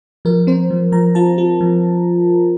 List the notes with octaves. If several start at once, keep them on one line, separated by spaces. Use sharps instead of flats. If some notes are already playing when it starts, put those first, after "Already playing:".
F3 A#4
C4 C5
F3
F3 A#5
F4 A5
F4
F3